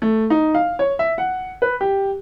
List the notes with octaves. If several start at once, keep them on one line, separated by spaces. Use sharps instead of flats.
A3
D#4
F5
C#5
E5
F#5
B4
G4